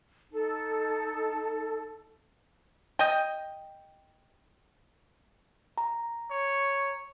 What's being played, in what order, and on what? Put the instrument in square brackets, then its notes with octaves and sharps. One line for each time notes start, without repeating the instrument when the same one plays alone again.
[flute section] D#4 A4 A5
[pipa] D#5 G5
[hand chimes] A#5
[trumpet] C#5